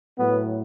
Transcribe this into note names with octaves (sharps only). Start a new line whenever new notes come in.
A2 F#3 B3